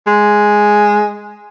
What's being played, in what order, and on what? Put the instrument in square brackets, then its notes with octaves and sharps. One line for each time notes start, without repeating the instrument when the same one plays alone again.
[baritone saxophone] G#3